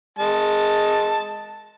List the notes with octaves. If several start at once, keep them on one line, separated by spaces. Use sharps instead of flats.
G#3 A5